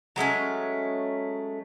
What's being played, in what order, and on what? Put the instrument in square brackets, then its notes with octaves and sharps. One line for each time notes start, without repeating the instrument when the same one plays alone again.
[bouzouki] F#3 G#3 A3 C#4